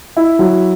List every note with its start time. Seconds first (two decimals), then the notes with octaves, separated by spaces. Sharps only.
0.17 E4
0.39 F#3